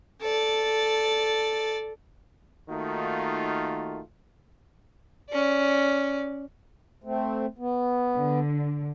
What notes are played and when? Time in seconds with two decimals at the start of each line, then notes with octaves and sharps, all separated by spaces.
0.21 A4 D5
2.69 D#3 A3 A#3 D#4 F4 F#4
5.29 C#4 D5
7.04 A3 C4
7.58 B3
8.17 D3